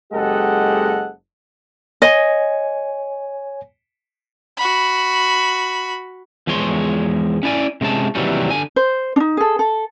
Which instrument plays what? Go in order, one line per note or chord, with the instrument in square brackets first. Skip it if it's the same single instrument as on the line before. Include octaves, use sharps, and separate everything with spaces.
[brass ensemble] F#1 G#3 G4 A4 D#5 F#5
[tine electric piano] C#5 G#5 [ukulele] D#5
[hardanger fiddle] F#4 B5
[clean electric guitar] E2 F3 G#3 C#5 C6
C#4 E4 D5 G#5
C3 G#3 C#4 A5
D#2 C3 E3 F#3 G3 C#4
D3 G#5
[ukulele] C5
D4 D#4
G#4 A4
A4